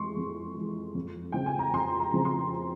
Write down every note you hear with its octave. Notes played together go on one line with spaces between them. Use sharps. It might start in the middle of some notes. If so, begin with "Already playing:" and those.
Already playing: F2 E3 G#3 C6 C#6
F2
E3 G#3
F2
C#3 F3 C4 G5
G#5
A#5
F2 C6
A#5
C#3 F3 C4
C6